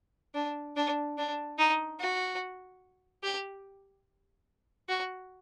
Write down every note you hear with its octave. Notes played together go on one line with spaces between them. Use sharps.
D4
D4
D4
D#4
F#4
G4
F#4